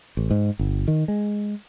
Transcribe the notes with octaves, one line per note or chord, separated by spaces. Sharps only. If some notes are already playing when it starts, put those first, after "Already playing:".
A1
G#2
G1
D#3
G#3